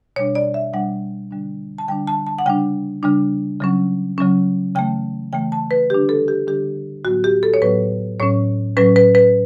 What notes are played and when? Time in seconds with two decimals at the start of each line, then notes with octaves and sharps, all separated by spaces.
0.16 B2 G3 D4 C#5
0.35 D5
0.54 E5
0.73 B2 G3 D4 F#5
1.31 D3 G3 D4
1.78 A5
1.88 D3 G3 D4 G5
2.07 A5
2.27 A5
2.38 F#5
2.46 C#3 G3 D4 G5
3.03 C#3 G3 D4
3.60 C#3 F#3 C#4
4.18 C#3 F#3 C#4
4.75 C#3 E3 A3 G5
5.33 C#3 E3 A3 G5
5.52 A5
5.71 B4
5.90 D3 G3 D4 G4
6.09 A4
6.28 G4
6.47 D3 G3 D4 G4
7.05 A2 F#3 B3 F#4
7.24 G4
7.43 A4
7.54 C#5
7.62 A2 F#3 B3 B4
8.20 A2 F#3 C#4 C#5
8.77 A2 F#3 C#4 B4
8.96 B4
9.15 B4